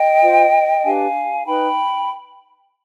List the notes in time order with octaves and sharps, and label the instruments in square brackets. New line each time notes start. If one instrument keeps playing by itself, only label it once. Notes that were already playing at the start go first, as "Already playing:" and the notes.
Already playing: [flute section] D#5 G5
F4 C5
D4 G4 B4 F5 G#5
D#4 B4 G5 B5